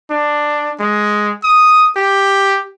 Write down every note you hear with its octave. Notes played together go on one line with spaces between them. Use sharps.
D4
G#3
D#6
G4